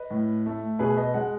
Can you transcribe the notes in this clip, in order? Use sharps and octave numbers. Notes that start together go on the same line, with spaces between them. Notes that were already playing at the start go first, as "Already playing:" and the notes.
Already playing: B4 D#5
A2
A3
B2 G#4 B4
B4 D#5
G#3 D#5 F#5